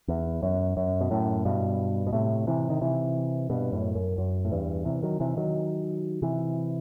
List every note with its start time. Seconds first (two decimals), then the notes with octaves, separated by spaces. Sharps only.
0.08 E2
0.43 F#2
0.77 F#2
1.01 B2
1.11 F#2 A2
1.45 G2 B2
2.07 B2
2.13 A2 C3
2.47 C3 E3
2.70 D#3
2.81 C3 E3
3.50 G2 B2
3.72 F#2 A2
3.95 F#2
4.18 F#2
4.45 A2
4.52 E2 G2
4.85 C3 E3
5.02 D#3 F#3
5.20 C3 E3
5.37 D#3 F#3
6.22 C3 E3